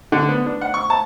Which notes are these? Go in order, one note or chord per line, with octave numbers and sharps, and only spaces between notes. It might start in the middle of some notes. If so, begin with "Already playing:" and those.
D3
B3
D4
F#5
C#6
A5